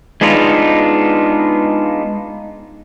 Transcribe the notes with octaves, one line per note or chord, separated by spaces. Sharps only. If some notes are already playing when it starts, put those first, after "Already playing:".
G#3 B3 D4 D#4 F4